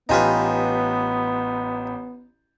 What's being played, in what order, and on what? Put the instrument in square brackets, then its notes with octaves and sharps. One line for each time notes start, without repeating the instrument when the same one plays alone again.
[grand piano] A1 G4 G#5 [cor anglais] B3 [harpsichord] D#4 F4 B4